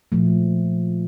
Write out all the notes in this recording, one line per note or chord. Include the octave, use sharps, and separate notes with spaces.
A#2 F3 A3